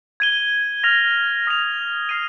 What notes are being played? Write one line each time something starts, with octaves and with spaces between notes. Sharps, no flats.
G#6 D#7 G7
F6 A#6 F7
D#6 A#6 F7
F6 G#6 C7 D#7